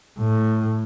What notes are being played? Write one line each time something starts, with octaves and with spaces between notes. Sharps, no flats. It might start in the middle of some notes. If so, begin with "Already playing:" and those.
A2